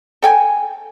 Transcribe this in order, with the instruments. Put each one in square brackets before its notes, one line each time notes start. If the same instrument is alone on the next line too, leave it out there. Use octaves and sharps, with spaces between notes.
[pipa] A4 G5 G#5